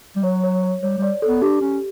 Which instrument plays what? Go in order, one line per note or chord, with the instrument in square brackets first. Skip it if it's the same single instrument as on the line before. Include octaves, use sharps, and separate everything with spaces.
[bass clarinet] G3
[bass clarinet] F#3 [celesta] C#5
[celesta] C#5
C#5
[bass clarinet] G3 [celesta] C#5
[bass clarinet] G3 [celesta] D5
[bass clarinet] B3 [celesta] A4
[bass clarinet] D4 [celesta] G4
[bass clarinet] C#4